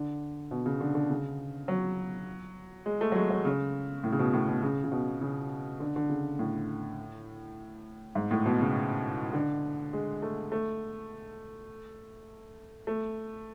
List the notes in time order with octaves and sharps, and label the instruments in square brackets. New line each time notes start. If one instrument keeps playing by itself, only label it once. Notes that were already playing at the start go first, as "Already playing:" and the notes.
Already playing: [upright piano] D3
B2
C#3
D3
D3
C#3
F#3
G#3
A3
F#3
G#3
F#3
C#3
A2
C#3
B2
A2
B2
C#3
C#3
B2
C#3
D3
D3
C#3
A2
G#2
A2
B2
C#3
D3
G#3
A3
A3
A3